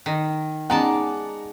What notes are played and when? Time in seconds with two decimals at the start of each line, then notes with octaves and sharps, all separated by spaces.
0.06 D#3
0.70 G#3 B3 C#4 D#4 D5 F#5 A5 A#5